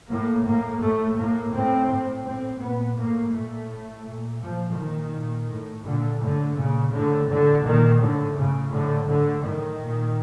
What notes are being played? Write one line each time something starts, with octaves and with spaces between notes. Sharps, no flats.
A2 A#3
A2 A#3
A2 A3
A2 A#3
A2 C4
A2
A2 C4
A#2 B3
A2 A#3
A#2 A3
A2
A#2
A#2 F3
A#2 D#3
A#2
A2
A#2 D3
A2 D3
A#2 C#3
A2 D3
A2 D3
A#2 D#3
A2 D3
A2 C#3
A2 D3
A2 D3
A2 D#3
A#2